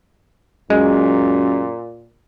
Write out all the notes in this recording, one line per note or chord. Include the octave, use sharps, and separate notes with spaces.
F#2 A#2 G#3